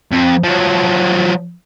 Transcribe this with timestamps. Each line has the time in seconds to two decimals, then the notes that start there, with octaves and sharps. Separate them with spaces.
0.12 F2
0.44 F3 F#3